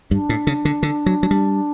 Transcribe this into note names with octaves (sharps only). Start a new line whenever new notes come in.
G2 D4
A2
C#3
D3
D3
F#3
F#3
G3